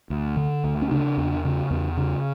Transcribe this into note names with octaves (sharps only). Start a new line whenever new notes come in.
D2
D3
D2
C#4
C#3 D4
E2
C#3
E2
C#3